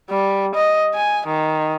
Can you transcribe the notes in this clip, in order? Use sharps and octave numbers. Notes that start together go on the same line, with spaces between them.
G3
D#5
G#5
D#3